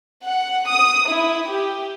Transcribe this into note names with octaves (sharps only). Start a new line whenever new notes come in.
F#5
D#6
E4
G4